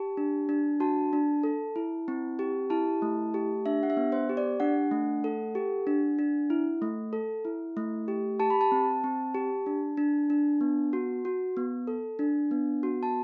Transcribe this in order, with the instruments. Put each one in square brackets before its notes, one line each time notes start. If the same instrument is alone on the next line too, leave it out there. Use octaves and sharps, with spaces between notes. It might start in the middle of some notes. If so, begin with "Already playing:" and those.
Already playing: [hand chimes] G4 A5
D4
D4
F#4 A5
D4
A4
E4
C4
G4
E4 A5
A3
G4
D4 E5
F#5
E5
B3
C5
G4
D5
D4 F#5
A3
A4
G4
D4
D4
E4
A3
A4
E4
A3
G4
G4 A5
B5
A5
C4
C4
G4
D4
D4
D4
B3
F#4
F#4
B3
A4
D4
B3
F#4
A5